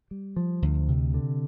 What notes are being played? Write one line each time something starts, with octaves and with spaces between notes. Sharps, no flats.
G3
F3
D2
C3
D3